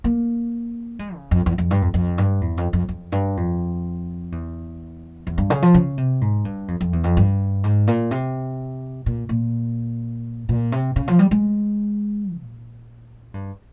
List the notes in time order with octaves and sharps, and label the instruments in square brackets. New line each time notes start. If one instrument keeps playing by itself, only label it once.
[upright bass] A#3
G#3
C#3
F2
E2
F2
G2
F2
F2
G2
E2
F2
F2
F2
G2
F2
E2
E2
G2
C#3
F3
C#3
C3
G#2
G2
F2
F2
E2
F2
G2
G#2
A#2
C3
A#2
A#2
A#2
C3
C#3
F3
G3
G#3
A#2
G2